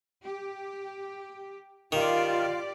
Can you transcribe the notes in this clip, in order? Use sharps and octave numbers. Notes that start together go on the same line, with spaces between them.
G4
D#3 F4 G4 D5